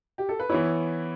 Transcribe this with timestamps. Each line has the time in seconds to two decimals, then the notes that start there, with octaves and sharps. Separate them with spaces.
0.18 G4
0.29 A4
0.39 B4
0.49 E3 B3 E4 C#5